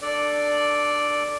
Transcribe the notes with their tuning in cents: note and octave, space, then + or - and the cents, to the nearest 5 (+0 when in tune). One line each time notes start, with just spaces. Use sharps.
D4 +20 A4 +0 D5 +0